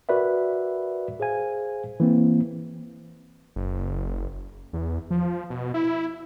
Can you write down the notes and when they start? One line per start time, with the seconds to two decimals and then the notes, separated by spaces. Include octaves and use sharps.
0.09 F#4 A#4 B4 D5 E5
1.20 G#4 C5 F5 G#5
2.00 E3 A#3 C4
3.56 F#1
4.73 E2
5.11 F3
5.50 B2
5.74 E4